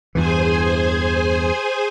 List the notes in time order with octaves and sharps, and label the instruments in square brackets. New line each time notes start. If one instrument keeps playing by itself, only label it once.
[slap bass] E2 G2 E3 [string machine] G#4 C5 G#5